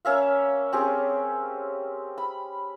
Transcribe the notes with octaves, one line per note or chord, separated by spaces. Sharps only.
A#3 C#4 E5 F5
C4 C#4 G4 G#4
B5